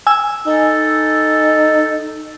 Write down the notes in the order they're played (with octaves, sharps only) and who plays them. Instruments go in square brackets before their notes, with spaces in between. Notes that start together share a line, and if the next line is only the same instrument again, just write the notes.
[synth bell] G#5 E6
[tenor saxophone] D#4 [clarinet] A4